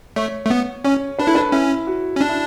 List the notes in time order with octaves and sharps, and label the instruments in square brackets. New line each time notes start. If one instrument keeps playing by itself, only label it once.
[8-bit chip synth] A3 [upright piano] C#5
[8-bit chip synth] A3
B3
[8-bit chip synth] C#4 [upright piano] C#5
[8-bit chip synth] D4 [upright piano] B4
[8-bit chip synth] E4 [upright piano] A4
[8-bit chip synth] D4 [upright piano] B4
[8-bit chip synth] C#4 [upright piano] E4
[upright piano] F#4
[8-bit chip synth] C#4
[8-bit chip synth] D4 [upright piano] F#4
[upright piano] E4